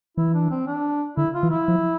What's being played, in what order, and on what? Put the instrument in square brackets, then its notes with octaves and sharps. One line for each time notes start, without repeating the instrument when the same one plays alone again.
[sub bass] E3 [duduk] E4
[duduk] D4
C4
D4
[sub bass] D3 [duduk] E4
[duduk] F4
[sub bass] E3
[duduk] E4
[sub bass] F3